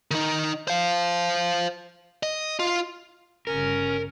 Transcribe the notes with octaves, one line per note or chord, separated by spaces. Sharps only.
D#3 D#4
C5 F5
D#5
F4
G1 G2 C#3 C#4 A#4